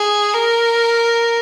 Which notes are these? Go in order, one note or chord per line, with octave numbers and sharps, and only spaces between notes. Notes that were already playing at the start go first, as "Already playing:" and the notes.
Already playing: G#4
A#4